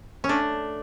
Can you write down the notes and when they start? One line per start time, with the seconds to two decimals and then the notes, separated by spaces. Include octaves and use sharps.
0.24 C#4
0.29 A3 D4